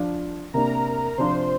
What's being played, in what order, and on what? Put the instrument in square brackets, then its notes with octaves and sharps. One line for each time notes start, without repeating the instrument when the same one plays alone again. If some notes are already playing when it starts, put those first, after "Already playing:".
Already playing: [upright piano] F3 D4 F4
[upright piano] C3 A#3 D4 [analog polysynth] A#4 A#5
[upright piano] C3 F3 D4 F4 [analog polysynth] C5 C6